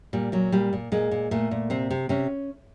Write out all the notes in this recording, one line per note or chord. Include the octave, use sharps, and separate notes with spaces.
A#2 G3
A#2 F#3
A#2 G3
A#2
A#2 G#3
A#2
A#2 A3
A#2
C3 C4
C3
C3 C#4